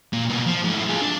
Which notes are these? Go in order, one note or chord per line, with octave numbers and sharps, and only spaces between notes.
A#2
B2 A#3
F3
G#2 A3
F4 G#4
D4